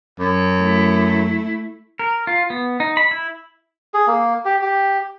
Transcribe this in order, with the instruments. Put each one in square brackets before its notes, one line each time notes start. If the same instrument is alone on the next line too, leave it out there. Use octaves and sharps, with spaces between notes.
[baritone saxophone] F#2
[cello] A3 E4
[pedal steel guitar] A#4
F4
B3
D#4
B5
E4
[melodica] G#4
A#3
G4
G4